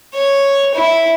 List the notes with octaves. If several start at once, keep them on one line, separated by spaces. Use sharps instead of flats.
C#5
E4